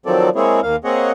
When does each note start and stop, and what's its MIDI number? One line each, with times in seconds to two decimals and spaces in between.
0.06 0.29 51
0.06 0.29 53
0.06 0.29 54
0.06 0.29 60
0.06 0.29 69
0.06 0.29 74
0.36 0.60 56
0.36 0.60 58
0.36 0.60 60
0.36 0.60 64
0.36 0.60 68
0.36 0.60 73
0.63 0.76 39
0.63 0.76 58
0.63 0.76 77
0.84 1.12 58
0.84 1.12 60
0.84 1.12 68
0.84 1.12 73
0.84 1.12 75
0.84 1.12 78